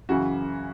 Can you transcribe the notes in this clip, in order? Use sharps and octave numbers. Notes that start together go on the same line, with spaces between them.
F#2 C#3 E3 F#4